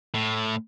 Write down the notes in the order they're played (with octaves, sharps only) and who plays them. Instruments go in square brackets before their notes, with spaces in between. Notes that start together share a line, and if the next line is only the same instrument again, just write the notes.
[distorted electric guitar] A2